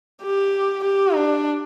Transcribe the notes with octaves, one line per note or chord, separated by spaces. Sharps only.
G4
G4
D4